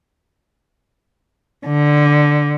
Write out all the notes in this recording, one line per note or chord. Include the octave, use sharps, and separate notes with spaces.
D3